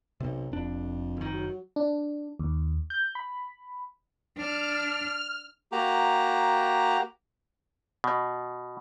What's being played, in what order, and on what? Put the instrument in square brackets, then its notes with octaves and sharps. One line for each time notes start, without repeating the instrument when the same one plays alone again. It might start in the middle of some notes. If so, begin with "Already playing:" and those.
[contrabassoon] B1 [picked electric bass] C3
[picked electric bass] F1 D4 [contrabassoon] F2
[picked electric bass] F#1 D#3
[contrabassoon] F#3
[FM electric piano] D4
D#2
G6
B5
[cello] D4 [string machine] F6
[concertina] A#3 F#4 G4 A#5
[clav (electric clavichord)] B2